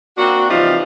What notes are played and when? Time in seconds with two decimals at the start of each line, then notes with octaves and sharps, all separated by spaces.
0.17 A#3 C4 D4 F#4
0.49 C3 E3 F3 G3 D#4 F4